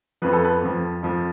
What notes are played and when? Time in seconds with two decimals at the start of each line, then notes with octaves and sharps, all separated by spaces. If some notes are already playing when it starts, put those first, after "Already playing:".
0.22 F2 F3 B4
0.33 A4
0.44 B4
0.62 F2 F3
1.03 F2 F3